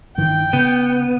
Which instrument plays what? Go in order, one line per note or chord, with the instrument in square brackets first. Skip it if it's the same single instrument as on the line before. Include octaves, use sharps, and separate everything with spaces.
[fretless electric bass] G2 D#3 E3 [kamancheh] G5
[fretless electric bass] C#3 [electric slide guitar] B3